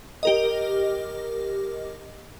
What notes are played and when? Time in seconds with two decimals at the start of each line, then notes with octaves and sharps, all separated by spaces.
0.23 G4 A#4 D#5